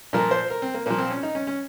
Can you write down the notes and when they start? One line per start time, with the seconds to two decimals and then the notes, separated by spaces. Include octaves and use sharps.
0.13 A#2 F3 A#4
0.31 C5
0.50 A#4
0.62 C4
0.74 A#3
0.86 A#2 F3 A#3
0.98 C4
1.10 C#4
1.23 D#4
1.35 C#4
1.47 C#4